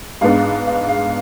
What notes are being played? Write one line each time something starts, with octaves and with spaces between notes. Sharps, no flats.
G#2 G#3 B3 D4 F5
F5
F5